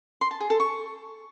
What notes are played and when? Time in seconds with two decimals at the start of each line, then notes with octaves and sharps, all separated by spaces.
0.21 C6
0.31 A5
0.40 G#4
0.50 A4
0.60 C#6